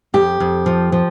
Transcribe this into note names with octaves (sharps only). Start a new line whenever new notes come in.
F2 G4
F2
F3
F3